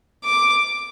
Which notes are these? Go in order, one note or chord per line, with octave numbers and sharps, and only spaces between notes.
D6